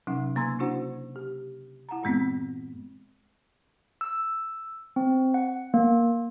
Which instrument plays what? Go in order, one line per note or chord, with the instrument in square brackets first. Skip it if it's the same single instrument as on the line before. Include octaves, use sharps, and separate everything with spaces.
[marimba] C3 F#3 C#4 D#4 F#5
C#3 A#3 A#5 C6 E6 G#6
C#4 D4 E4 F#4 C5 F#5
G4
E4 F#5 A5 A#5
G2 A#2 E3 G#3 B3 C4
[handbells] E6
C4
F#5
A#3